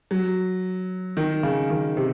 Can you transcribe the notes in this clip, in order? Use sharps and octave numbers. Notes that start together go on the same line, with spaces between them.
F#3
D#3
C#3
D#3
C3